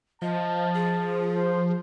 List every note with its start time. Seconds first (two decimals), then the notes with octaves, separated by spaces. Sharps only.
0.22 F3 D#5 A5
0.74 G#4
1.35 C5